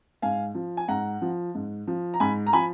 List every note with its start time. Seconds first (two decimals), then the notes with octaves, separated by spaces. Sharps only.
0.22 G#2 F5 G#5
0.55 F3
0.77 G#5
0.88 G#2 F#5 A#5
1.22 F3
1.55 G#2
1.87 F3
2.14 A#5
2.20 G#2 G#5 B5
2.47 A#5
2.53 F3 G#5 B5